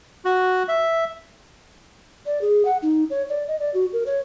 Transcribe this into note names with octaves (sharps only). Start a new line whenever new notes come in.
F#4
E5
D5
G#4
F#5
D#4
C#5
D5
D#5
D5
F#4
A#4
C#5